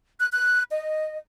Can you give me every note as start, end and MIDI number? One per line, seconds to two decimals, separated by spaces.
0.20 0.27 90
0.31 0.63 90
0.72 1.17 75